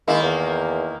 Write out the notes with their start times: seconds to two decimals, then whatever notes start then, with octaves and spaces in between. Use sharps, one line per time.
0.08 D#3 G#3 A#3 E4
0.22 E2